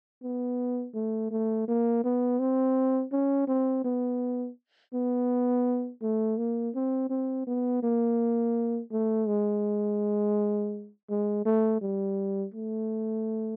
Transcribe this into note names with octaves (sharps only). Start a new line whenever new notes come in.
B3
A3
A3
A#3
B3
C4
C#4
C4
B3
B3
A3
A#3
C4
C4
B3
A#3
A3
G#3
G#3
A3
G3
A3